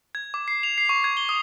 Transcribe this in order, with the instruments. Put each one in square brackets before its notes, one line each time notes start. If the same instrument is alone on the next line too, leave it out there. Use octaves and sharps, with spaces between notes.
[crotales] G#6
D6
C7
F7
C7
C#6
G#6
G7
D#6